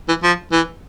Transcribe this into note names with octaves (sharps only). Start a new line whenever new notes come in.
E3
F3
E3